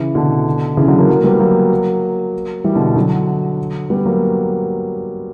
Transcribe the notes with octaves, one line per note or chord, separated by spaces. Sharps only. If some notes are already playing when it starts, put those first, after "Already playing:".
Already playing: C#3 E3
B2 D3
C#3 E3
D3 F#3
F#3 A#3
F#3 A#3
G3 B3
F#3 A#3
E3 G3
B2 D3
D3 F#3
G3 B3
F#3 A#3